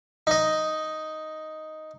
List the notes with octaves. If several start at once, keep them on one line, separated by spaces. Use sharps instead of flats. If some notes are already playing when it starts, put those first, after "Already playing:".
D#4 D#5